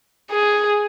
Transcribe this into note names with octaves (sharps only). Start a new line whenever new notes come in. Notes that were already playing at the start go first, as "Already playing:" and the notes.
G#4